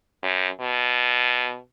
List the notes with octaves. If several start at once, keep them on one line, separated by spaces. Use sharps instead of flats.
F#2
B2